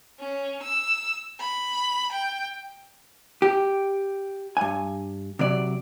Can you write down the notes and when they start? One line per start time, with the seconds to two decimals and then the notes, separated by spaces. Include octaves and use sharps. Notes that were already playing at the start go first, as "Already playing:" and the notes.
0.19 C#4
0.63 E6
1.40 B5
2.12 G5
3.42 G4
4.57 G2 G#5
5.39 C3 F#3 D5